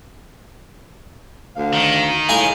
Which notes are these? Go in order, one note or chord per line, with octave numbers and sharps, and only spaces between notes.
D2 F5
D#3
A2 G#3 F5 G#5 A#5